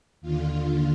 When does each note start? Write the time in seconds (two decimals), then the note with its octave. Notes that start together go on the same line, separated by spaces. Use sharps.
0.21 D#2 D3 F4